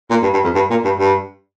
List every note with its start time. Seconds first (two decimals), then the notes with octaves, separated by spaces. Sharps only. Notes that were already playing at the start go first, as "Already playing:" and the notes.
0.11 A#2
0.22 G2
0.33 G2
0.44 F2
0.55 G2
0.70 A#2
0.85 G2
0.99 G2